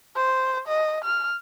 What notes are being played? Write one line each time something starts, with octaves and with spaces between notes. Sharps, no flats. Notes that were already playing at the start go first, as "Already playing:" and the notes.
C5
D#5
F6